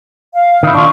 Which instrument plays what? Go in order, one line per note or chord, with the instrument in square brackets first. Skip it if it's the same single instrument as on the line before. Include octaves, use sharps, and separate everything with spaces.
[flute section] F5
[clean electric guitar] D#3 E4
[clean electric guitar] D4 F4 [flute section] C#6